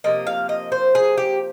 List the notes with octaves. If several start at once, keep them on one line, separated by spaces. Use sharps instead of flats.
C3 F3 A#3 D#5
F5
D#5
C5
G#4
G4